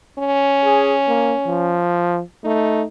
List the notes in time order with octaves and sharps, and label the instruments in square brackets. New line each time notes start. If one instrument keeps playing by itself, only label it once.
[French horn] C#4
[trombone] G#4
A#3
F3
[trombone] A3 [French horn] D#4